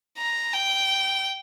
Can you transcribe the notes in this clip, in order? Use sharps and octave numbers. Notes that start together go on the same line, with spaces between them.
A#5
G5